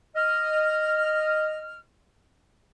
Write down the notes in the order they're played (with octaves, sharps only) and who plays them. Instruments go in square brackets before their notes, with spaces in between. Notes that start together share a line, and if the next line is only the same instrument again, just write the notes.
[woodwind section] D#5 F6